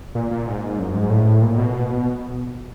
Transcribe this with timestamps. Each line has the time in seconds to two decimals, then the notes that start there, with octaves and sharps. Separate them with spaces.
0.15 A#2
0.31 A#2
0.47 G#2
0.79 F#2
0.94 G#2
1.10 A2
1.42 A#2
1.58 B2